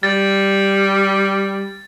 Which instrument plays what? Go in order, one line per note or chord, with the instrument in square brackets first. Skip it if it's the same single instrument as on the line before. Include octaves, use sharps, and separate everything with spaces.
[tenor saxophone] G3 [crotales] A6